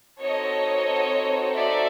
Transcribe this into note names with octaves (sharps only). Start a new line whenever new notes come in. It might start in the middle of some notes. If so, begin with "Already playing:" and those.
C4 D#4 F#4 A4 C#5 D#5
D5 E5